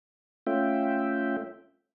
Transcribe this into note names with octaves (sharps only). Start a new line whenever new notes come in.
A3 C#4 F4 E5 G5